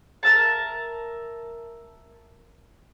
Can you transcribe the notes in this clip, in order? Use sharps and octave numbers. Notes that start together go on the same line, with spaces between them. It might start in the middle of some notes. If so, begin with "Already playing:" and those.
A#4 E5 A5